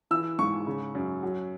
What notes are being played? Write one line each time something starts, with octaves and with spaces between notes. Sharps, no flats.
E3 E6
G#2 C#6
C#3
F#2
F#3